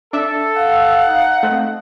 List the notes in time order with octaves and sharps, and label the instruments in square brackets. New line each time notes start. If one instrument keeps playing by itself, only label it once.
[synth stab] D4 E5 [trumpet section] A4
[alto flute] F5 [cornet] F#5
[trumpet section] D#4
[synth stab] A3 C4